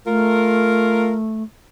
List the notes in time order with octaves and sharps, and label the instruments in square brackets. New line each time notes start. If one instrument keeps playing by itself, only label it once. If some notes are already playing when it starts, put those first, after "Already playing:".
[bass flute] A3 [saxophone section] F4 A#4